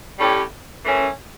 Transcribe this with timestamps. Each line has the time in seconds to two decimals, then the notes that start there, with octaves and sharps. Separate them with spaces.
0.18 A2 G3 C#4 G4
0.84 F#2 E3 A3 C#4